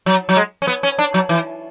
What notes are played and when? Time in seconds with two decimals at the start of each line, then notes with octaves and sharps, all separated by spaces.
0.06 F#3
0.29 F#3
0.37 G#3
0.62 C#4
0.67 B3
0.83 C#4
0.99 D4
1.14 F#3
1.29 E3